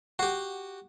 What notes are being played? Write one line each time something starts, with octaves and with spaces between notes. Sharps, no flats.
F#4 G4 F#5